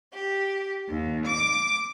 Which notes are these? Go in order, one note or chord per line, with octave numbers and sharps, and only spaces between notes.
G4
D#2
D6